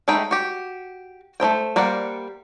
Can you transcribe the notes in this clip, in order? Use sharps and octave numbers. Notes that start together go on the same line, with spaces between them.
G#3 A3 D#4 G5 B5
F#4 G4
A3 D#4 C5 G5
G3 A#3 C5 D5 F#5